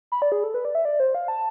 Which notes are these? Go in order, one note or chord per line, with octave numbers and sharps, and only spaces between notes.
B5
D5
G#4
A4
B4
D5
E5
D5
C5
F5
A5